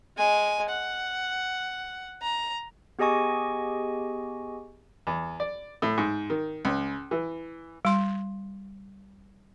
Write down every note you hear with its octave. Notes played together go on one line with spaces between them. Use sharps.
G#3 G#5
F#5
A#5
B3 G4 G#4 D#5 G#5 C#6
E2
D5
A2
G#2
D#3
C#2
E3
G3 C6